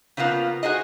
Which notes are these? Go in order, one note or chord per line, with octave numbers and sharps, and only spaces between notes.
C#3 F3 A#3 B3 F4
F#4 G#4 C5 D#5